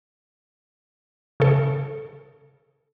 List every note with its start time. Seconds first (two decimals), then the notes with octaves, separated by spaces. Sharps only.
1.40 C#3 A4